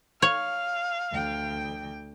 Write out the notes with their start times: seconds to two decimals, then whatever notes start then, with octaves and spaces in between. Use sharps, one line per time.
0.22 C#5 F5
1.12 D2 G5